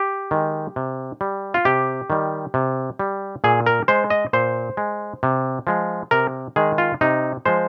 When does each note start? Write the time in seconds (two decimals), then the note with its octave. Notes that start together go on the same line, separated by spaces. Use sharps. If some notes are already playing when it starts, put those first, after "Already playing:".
Already playing: G4
0.31 D#3 G#3
0.76 C3
1.21 G3
1.54 F4
1.65 C3 G4
2.10 D#3 G3
2.54 C3
2.99 G3
3.44 A#2 G#4
3.66 A#4
3.88 G#3 C5
4.10 D#5
4.33 A#2 C5
4.77 G#3
5.23 C3
5.67 F3 G#3
6.11 C3 A#4
6.56 D#3 G#3 G#4
6.78 F4
7.01 C3 D#4
7.45 F3 G#3 C5